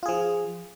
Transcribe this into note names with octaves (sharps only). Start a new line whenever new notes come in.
F3 F4 G#4